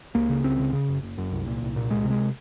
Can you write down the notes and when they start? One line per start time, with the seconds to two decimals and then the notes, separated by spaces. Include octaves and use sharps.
0.15 C#2 A#3
0.29 C#3
0.44 C#2 C4
0.59 C#3
0.73 C#3
0.88 F#1
1.03 F#1
1.18 F#2
1.32 C2
1.46 A#2
1.62 C2
1.76 A#2
1.90 C#2 G#3
2.05 C3
2.10 G#3